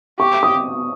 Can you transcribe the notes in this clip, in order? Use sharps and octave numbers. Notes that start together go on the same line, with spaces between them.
G4 C#6
D#6